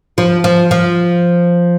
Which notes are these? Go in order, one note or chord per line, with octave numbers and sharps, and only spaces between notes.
F3
F3
F3